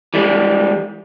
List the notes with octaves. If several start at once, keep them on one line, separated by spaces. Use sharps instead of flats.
E3 G3 G#3